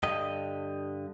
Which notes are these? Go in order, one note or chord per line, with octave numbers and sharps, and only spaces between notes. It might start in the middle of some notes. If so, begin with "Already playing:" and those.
G2 D3 G4 D#5